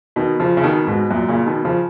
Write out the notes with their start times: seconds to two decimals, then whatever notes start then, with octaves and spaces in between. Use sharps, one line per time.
0.16 B2 D#3
0.40 C#3 F3
0.57 C#3
0.63 B2 D#3
0.87 G#2 B2
1.11 F#2 A#2
1.28 A#2 C#3
1.46 B2 D#3
1.65 C#3 F3